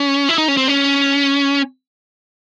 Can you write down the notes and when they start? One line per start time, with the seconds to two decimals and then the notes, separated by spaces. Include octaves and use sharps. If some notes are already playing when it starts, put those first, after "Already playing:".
Already playing: C#4
0.29 E4
0.38 D#4
0.48 C#4
0.57 C4
0.68 C#4